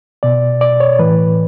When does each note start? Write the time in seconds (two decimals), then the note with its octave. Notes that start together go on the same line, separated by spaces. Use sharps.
0.23 B2 D5
0.61 D5
0.80 C#5
0.99 A2 E3 B4